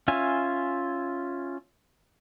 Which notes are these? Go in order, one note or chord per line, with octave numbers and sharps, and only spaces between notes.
C#4 F4 E5 G#5